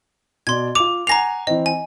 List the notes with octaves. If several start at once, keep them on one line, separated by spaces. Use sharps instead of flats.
B2 D5 C6 G#6
F4 D6 F7
F#5 G#5 A#5 A#6 C7 F7
E3 C4 D#5
G#5